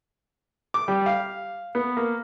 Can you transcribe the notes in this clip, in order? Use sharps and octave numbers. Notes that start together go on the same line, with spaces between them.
D6
G3
F5
B3
A#3